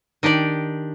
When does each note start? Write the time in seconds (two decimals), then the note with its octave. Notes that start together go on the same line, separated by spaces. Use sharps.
0.23 D#3 D4 G4 D5